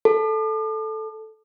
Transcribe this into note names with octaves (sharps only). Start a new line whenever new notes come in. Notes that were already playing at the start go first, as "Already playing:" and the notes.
A4